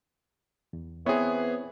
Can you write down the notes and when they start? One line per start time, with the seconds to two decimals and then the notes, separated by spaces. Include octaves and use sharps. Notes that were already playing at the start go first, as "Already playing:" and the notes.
0.73 E2
1.06 E3 B3 C4 E4 G#4 C#5